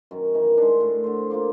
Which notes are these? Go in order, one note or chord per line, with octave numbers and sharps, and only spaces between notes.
F#2 D#3 D6
D#3 E3 D#4
G#3 D4
A2
D3 C5
A#3 F4 C5 D6